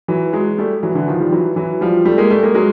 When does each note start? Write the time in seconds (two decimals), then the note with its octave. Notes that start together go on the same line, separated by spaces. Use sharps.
0.08 E3 F#3
0.33 F#3 G#3
0.58 G3 A3
0.83 E3 F#3
0.95 D3 E3
1.08 D#3 F3
1.20 G3
1.32 E3 F#3
1.56 E3 F#3
1.81 F3 G3
2.05 G3 A3
2.17 G#3 A#3
2.30 G3 A3
2.43 G#3 A#3
2.54 F#3 G#3